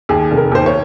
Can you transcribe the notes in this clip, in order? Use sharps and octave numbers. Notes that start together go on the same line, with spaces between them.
D#2 G#4
F1
A#4
D#2 C5
C#5